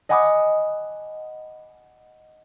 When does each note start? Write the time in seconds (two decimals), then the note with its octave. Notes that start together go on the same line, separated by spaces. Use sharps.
0.09 D#5 F#5 G#5 B5 D6 D#6